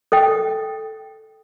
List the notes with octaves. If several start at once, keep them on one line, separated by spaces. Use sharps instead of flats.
A4 D#5 G5